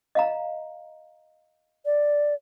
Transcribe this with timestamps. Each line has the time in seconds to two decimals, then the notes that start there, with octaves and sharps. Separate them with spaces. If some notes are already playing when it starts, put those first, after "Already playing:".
0.15 D#5 F5 A#5
1.85 D5